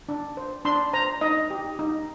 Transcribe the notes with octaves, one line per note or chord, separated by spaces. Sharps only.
D4
C5
D4 C6
C5 A#5
D#4 D#5
G4
D#4